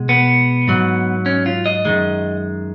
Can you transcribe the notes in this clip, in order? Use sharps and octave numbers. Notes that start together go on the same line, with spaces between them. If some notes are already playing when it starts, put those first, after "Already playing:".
Already playing: B2 G#3
B3
G#2 F#3
C#4
F4
D#5
F#2 D#3 G#3